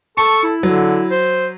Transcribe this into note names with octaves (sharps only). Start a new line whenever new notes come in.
A4 A5 C#6
E4
D3 F#3
C5